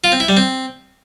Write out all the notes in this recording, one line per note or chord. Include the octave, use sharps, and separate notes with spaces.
F4
C4
E4
G3
C4